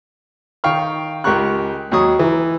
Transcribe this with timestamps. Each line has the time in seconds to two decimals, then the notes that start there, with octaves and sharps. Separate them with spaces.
0.64 D#3 F5 G5 C#6 F6
1.24 C#2 G4 A#4 C#6 F#6
1.92 D#2 F#3 C#6 D#6
2.19 E3